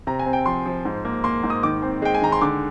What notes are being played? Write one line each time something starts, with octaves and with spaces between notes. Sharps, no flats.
C3 A#5
G#5
C4
G5
F3 C6
F3
G#2
A#3
A#3 C6
G#2
D#6
D#3 D6
C4
G#3 G5
G#5
D#3 A#5
C6
D3 D6